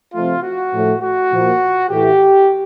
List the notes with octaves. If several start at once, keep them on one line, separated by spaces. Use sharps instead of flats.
C3 F3 A3 F4
F#4
A2 F3 A3
F#4
A#2 F3 A#3
A2 E3 A3 G4